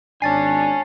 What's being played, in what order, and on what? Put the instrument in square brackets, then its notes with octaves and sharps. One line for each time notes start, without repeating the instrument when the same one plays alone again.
[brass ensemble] G#1 D4 [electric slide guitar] C#5 G#5 [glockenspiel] A5 A6 C7